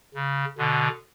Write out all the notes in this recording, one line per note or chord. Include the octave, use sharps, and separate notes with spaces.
C#3
B2 D3